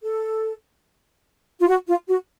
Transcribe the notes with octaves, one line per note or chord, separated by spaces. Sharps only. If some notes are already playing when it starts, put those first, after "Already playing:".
A4
F4
F#4
F4
F#4